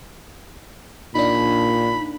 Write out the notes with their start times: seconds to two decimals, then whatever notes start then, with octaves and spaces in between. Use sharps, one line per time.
1.15 A#2 D4 D#4 B5